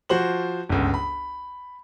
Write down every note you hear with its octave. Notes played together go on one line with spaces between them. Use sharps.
F3 F#4 C5 F#7
G1 C#2
B5